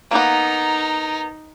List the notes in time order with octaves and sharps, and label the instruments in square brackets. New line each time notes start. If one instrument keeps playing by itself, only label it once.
[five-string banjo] A#3 B3 [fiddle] D#4 [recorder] A#5